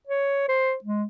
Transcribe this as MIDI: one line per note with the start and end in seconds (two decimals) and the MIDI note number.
0.07 0.47 73
0.48 0.75 72
0.84 1.05 56